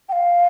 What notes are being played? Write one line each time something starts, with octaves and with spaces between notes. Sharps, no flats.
G5
F5